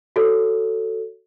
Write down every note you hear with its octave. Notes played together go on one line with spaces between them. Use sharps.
F#4 A4 C#5